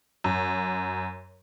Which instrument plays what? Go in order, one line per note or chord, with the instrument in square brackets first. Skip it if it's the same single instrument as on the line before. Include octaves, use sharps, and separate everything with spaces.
[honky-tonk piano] F#2